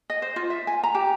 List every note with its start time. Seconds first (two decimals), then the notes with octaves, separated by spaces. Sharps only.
0.10 D#5
0.22 C5
0.36 F4
0.50 E5
0.67 G#5
0.83 A#5
0.95 G4